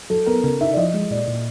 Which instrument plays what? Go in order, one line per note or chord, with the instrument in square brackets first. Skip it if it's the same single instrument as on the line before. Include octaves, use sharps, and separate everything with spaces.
[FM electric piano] F#3 [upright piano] A4
[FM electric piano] B3 [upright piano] A#4
[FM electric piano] C#3 [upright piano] A#4
[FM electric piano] D#4 [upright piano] E5
[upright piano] D5
[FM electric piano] F3 [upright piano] D#5
[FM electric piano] G#3
[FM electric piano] A#2 [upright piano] D5
[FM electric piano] A#2